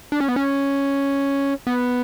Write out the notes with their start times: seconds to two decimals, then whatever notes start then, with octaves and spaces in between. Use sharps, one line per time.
0.12 D4
0.20 C#4
0.28 B3
0.36 C#4
1.67 B3